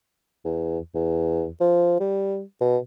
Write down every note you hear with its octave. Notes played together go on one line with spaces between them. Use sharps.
E2
E2
F3
G3
B2